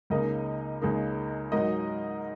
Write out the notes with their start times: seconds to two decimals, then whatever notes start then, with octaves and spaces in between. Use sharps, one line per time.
0.10 C#2 C#3 A#3 D#4 A#4 D#5
0.81 C#2 C#3 A#3 D#4
1.52 G#2 F#3 D#4 A#4 D#5